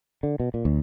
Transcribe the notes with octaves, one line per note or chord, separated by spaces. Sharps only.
D3
B2
A#2
D2